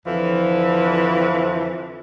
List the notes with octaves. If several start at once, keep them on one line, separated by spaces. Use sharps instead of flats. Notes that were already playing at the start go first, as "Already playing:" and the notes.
F2 D3 E3 F3